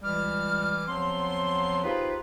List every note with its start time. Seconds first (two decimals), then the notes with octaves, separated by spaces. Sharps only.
0.02 C#2 E3 G3 D6 F6
0.87 E2 F3 F#3 C4 C6
1.83 D#4 F4 G4 G#4 B4 C5